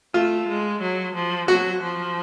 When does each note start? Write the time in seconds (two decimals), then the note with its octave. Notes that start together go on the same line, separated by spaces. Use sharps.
0.14 A3 F4
0.48 G#3
0.82 F#3
1.15 F3
1.48 F#3 F#4
1.82 F3